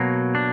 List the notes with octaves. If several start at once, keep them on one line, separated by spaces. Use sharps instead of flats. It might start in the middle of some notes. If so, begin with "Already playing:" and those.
Already playing: B2 F#3 A#3
D4